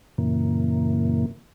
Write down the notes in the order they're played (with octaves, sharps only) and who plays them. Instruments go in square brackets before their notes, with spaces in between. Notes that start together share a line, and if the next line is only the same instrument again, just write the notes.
[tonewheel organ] F#2 A#2 C#3 E3 A#3